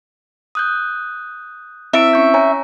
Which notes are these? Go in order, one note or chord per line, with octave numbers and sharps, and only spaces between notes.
D#6 F#6 G6
C4 E4 E5 D7
C#4 C#6 G6
C#5 G#5 A#5